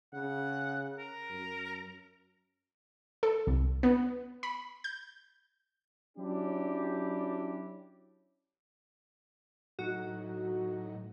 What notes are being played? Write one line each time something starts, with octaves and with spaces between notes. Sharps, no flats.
C#3 F#5
A#4
F#2
A4
C2
B3
B5
G6
F#3 C#4 D4 E4 G4
A2 F#3 D#4 F#4